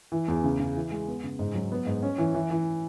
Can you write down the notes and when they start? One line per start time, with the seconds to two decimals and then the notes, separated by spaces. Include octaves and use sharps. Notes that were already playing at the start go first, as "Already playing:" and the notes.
0.12 E3
0.28 E2
0.44 C#3
0.59 C#3
0.76 E3
0.91 G#3
1.08 B3
1.24 C#3
1.39 G#2
1.55 F#3
1.72 B3
1.86 G#2
2.03 C#4
2.18 E3
2.34 E3
2.51 E3